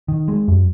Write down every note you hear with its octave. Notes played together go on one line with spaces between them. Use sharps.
D#3
G#3
F#2